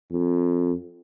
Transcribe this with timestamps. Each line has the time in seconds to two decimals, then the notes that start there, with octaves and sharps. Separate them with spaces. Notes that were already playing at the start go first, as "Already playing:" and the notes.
0.12 F2